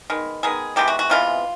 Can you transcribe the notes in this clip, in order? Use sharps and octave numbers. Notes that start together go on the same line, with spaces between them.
D#3 G#3 B3
D#3 G#3 B3 G#4
C3 E3 G#3 B3 G4
F#4
F#4
C3 E3 G#3 B3 F4